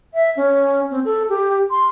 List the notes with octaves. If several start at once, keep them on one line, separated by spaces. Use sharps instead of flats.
E5
C#4
C4
A4
G4
C6